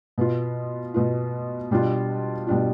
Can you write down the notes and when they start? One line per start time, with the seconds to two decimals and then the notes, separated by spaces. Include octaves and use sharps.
0.18 B2 B3 F4
0.94 B2 B3 F4
1.71 B2 G3 D4 F4
2.47 B2 G3 D4 F4